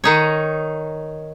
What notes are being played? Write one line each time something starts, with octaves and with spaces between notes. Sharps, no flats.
D#3 D#4 C#5